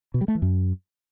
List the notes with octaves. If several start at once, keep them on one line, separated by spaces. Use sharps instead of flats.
B2
G3
A3
E3
F#2